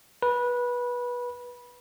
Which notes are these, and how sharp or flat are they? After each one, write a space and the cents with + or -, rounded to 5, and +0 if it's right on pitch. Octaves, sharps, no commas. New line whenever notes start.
B4 -20